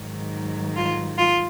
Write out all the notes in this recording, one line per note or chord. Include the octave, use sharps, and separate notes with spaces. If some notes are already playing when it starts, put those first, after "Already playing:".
Already playing: G#2 D#3 F#3
F4
F4